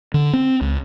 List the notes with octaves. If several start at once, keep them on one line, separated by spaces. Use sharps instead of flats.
D3
C4
C#2